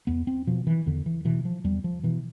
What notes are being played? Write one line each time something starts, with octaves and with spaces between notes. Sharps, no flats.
E2 B3
C4
B2 F3
E3
E2 D3
E3
B2 E3
F3
E2 G3
F3
B2 E3